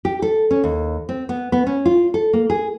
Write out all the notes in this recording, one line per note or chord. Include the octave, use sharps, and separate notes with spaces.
G4
A4
C#4
D#2
C4
B3
B3
C#4
F4
A4
A#3
G#4